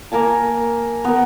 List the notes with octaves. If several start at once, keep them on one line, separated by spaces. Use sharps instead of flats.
A#3 A#4 G#5 A5
B3 A#4